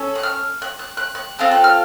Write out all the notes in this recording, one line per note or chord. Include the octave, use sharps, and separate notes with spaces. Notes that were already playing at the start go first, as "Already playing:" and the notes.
Already playing: C#4 A4
F#6
F6
F#6
F#6
F#6
F#6
C4 F4 A4 F#6
F#6
F6